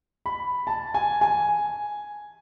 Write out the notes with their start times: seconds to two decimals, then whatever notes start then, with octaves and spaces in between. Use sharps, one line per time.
0.26 B5
0.67 A5
0.94 G#5
1.21 G#5